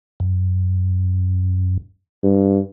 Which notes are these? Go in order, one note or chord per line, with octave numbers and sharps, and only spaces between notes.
F#2
G2